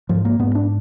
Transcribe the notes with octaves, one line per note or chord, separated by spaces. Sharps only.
G#2 F3
A#3
G#2 B3
D4